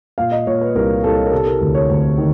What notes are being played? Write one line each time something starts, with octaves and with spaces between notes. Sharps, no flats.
A#2 F5
D#5
A#2 C#5
B4
C2 A#4
C2 A4
A#4
C3 A4
A#4
D2
C#5
D2
D#3